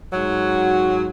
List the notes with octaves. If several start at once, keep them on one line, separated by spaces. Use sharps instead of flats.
G#2 F#3